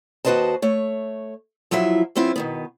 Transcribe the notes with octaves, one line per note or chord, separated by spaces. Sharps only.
D#2 F#4 B4 C5 D#5 A5
A3 C#5
F3 F#3 E4 F4 E5
F#3 B3 C4 E4 F4
B2 D#3 B3